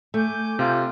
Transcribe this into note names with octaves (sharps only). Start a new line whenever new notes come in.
A3 G#5 D6 G6
C3 F4